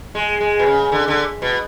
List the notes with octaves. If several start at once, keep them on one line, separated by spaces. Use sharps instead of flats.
G#3
G#3
B2
C#3
D3
D3
B2